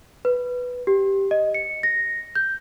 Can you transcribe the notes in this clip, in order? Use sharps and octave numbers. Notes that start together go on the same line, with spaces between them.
B4
G4
D#5
C#7
A#6
G6